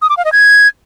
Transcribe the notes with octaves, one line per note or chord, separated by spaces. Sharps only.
D#6
D6
F5
D#5
G#6